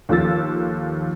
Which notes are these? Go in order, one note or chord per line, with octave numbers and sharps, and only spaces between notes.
D#2 F3 A4 E6 A6